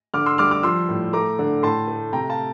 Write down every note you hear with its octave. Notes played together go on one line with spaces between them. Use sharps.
D3 D6 F6
C6 E6
G3 D6 F6
D6 F6
F3 C6 E6
A2
A3 A#5 D6
D3
A2 A5 C6
A3
C3 G5 A#5
F5 A5